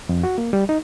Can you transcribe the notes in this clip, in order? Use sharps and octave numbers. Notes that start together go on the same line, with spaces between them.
F2
F#4
A#3
G3
D#4